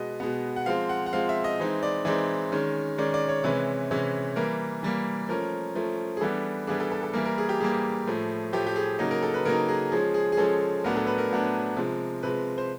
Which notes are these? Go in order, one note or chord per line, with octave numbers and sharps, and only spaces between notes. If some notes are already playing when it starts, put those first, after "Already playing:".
Already playing: B2 G#3 B3 D#5
B2 G#3 B3
F#5
F3 G#3 C4 F5
F#5
F#5
F3 G#3 C4 F5
E5
D#5
E3 G#3 C4 D#4
D5
E3 G#3 C4 D#4 D5
D#3 G#3 C#4
D#3 G#3 C#4 D5
D5
C#5
C3 E3 G#3 C#4 B4
C3 E3 G#3 C#4
E3 G3 A#3 A#4
E3 G3 A#3
F3 A3 C#4 A#4
F3 A3 C#4
G#4
E3 G3 B3 D4 A4
E3 G3 B3 D4 G#4
A4
A4
A4
E3 G3 A#3 A#4
A#4
G#4
G4
E3 G3 A#3 G#4
A2 F3 A3
A2 F3 A3 G4
G4
G#4
C#3 F#3 A#3 D#4
A#4
A4
B4
C#3 F#3 A#3 D#4 A#4
G#4
F3 G#3 C#4 G#4
G#4
G#4
F3 G#3 C#4 A4
A2 F#3 B3 D4 A#4
A4
B4
A#4
A2 F#3 B3 D4
C3 F3 G#3
C3 F3 G#3 B4
C5